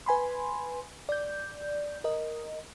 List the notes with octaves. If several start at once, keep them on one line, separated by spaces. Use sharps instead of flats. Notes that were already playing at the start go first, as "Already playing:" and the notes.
B4 G#5 B5 C6
D5 G6
A#4 D#5